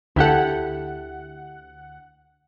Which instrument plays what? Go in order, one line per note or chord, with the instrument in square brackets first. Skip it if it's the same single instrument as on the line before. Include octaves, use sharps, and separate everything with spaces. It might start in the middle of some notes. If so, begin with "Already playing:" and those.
[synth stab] D2 F#5 [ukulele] E4 G4 A4